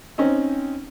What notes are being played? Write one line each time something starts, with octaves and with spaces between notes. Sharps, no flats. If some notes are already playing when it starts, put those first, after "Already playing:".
C4 C#4 D#4